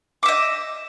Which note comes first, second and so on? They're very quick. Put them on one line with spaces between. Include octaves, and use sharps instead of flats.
D6 E5 D#5